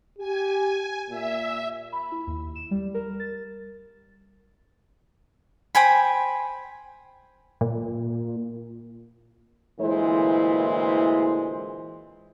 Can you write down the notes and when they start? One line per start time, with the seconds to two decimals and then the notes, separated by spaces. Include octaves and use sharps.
0.18 G4 G#5
1.10 A#2 E5
1.92 B5
2.12 E4
2.27 D#2
2.55 E7
2.71 G3
2.94 A#4
3.20 A6
5.75 C5 G5 G#5 B5
7.61 A#2
9.80 D2 A#2 E3 G#3 E4 C5